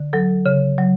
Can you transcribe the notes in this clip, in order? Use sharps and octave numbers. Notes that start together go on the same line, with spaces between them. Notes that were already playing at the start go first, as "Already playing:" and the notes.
Already playing: D3
F#3 A4
C#3
F#3